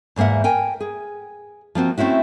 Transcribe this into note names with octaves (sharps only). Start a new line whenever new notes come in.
E2 G#2 A#3 E5 F#5
A#4 G5 G#5
G#4
F3 A#3 C4 F#4
A3 C4 C#4 E4 F#4